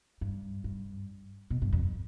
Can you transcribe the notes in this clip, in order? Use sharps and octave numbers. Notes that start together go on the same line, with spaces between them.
G2
G2
B2
G2
F2